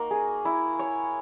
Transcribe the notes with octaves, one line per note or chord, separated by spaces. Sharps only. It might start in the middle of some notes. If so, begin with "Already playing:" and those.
Already playing: A#3 D#4 F#4
G#4
E4
C#5